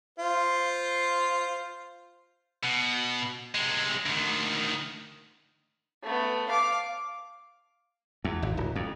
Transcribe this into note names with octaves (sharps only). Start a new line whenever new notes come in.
F4 C5
B2
C3 G#3
D2 D#3
A3 B3
F5 D6
E2
G#1
D1
F2